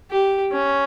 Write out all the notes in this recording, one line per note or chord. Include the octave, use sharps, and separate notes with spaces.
G4
C#4